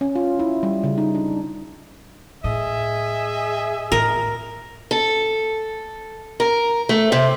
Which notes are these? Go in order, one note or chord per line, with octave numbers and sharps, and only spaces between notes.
C#4
F4
E4
G3
C#3
D#4
D4
A2 G#4 D#5 E5
A2 A#4
A4
A#4
A3
C3